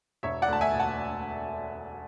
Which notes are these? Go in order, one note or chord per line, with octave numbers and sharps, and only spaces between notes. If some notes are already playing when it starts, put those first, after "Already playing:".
E1 C#5 E5
D5 F#5
D2 A5
E5 G#5
E1
F#5 A5